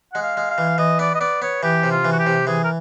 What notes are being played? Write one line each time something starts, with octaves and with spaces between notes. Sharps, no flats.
G#3 F#5
F5
G#3
F5
E3
E3 D#5
B3 D5
D#5
B3 D5
B3 C#5
E3 G4
C3
F4
E3
F#4
G4
C3
E3 G#4
A#4